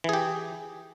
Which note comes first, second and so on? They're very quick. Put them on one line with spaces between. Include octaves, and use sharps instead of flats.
E3 G#4 G4